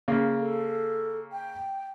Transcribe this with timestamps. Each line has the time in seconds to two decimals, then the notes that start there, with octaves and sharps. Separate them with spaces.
0.08 C#3 A#3
0.40 A4
1.32 G5